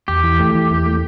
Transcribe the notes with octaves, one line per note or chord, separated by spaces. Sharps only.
E2 G4
E3
A3
E3
E2
A3